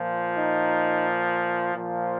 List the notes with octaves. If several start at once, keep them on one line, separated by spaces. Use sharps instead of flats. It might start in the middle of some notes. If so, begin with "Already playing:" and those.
Already playing: A#2 F3
D#4
A#2 F3